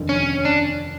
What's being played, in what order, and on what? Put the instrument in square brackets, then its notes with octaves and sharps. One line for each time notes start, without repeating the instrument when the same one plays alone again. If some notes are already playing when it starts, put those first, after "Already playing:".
Already playing: [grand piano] F1 D#2 D3 F3
[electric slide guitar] C#4
D4